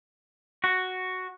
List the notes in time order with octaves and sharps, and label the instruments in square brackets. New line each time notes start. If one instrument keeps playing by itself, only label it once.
[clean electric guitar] F#4